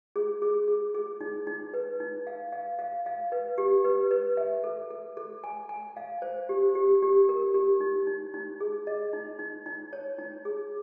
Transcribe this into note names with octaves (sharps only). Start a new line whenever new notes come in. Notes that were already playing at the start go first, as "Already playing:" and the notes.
G#4
G#4
G#4
G#4
D#4
D#4
B4
D#4
F5
F5
F5
F5
B4
G4
B4
B4
E5
A4
A4
A4
G#5
G#5
F5
C5
G4
G4
G4
A#4
G4
D#4
D#4
D#4
G#4
D#5
D#4
D#4
D#4
C#5
D#4
G#4